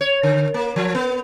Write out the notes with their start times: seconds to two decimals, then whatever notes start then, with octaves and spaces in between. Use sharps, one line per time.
0.01 C#5
0.23 D3
0.54 A#3
0.76 F3
0.95 B3